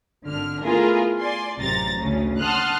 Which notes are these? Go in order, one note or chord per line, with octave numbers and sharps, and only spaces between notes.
G#1 D3 F6
A3 B3 E4 F4 G#4 A#4
D5 G#5 C6
A1 F#2 C3 A#5 A6
D2 C#3 C#4
F#5 A5 C6 D#6 F6 F#6